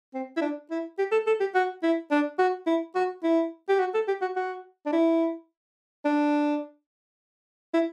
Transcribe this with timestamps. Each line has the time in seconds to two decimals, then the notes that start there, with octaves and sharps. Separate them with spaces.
0.14 C4
0.37 E4
0.41 D4
0.70 E4
0.98 G4
1.12 A4
1.27 A4
1.40 G4
1.55 F#4
1.83 E4
2.11 D4
2.38 F#4
2.66 E4
2.95 F#4
3.23 E4
3.69 G4
3.80 F#4
3.94 A4
4.08 G4
4.21 F#4
4.36 F#4
4.86 D4
4.93 E4
6.05 D4
7.74 E4